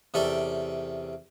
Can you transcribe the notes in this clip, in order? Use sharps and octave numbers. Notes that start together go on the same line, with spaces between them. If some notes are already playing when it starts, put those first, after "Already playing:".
E2 C3 C#4 A4 D5 G5